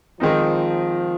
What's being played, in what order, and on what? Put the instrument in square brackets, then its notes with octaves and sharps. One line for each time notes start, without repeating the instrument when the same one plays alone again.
[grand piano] D#3 G#3 C4 D#4 [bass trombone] F3